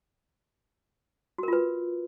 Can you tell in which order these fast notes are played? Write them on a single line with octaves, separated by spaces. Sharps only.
F#4 A#4 F4 B4